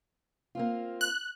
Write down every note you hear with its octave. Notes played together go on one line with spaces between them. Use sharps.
A#3 C4 F4
F#6